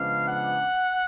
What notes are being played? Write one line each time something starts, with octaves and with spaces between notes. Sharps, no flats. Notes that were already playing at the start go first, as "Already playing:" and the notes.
Already playing: C#3 F3 G#3 B3 D4 F5
F#5